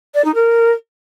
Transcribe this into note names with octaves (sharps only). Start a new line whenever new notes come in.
D5
D#4
A#4